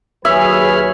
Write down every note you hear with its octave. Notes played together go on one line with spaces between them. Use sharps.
D#2 F#3 G#4 B4 C#5 E5 B5 F6